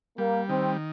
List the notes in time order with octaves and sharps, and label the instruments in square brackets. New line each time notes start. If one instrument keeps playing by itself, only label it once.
[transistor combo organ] G3 [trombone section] A#3
[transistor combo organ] D#3 [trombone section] C4